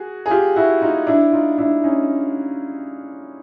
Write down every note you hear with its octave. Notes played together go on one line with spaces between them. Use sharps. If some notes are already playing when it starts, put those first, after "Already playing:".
Already playing: F#4 G#4
G#4
F4 G4
E4 F#4
D#4 F4
D4 E4
D#4 F4
D4 E4
C#4 D#4